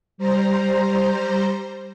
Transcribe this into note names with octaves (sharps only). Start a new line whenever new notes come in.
G3 C5 A#5